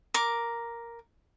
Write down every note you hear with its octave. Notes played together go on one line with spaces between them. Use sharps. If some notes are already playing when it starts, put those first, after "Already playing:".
A#4 D6